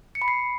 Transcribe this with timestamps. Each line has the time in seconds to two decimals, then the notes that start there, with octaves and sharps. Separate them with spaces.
0.15 C#7
0.22 B5
0.28 C7